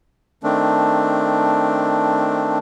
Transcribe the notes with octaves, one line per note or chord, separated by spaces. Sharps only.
D#3 A3 C4 D4